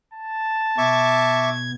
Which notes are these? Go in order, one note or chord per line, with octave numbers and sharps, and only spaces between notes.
A5
B2 E5 C#6 D6 G#6